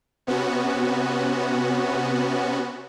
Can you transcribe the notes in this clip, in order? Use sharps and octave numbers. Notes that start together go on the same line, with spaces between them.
C3 B3 C#4 F#4